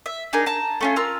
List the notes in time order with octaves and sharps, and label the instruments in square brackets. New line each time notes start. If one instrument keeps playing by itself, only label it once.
[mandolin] E5
D4 D#4 G#4 A#4
A5 A#5
A3 C#4 F4
F4 A#4 E6